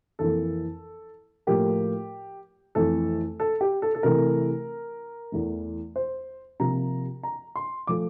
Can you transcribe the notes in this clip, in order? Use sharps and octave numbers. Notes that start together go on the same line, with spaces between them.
F2 E3 A#3 A4
A2 F3 A#3 G4
F2 E3 A3 A4
A4
G4
A4
A4
C3 E3 A3 A#4
E2 E3 A3
C5
C3 F3 A#3 A#5
A#5
C6
F3 A3 D6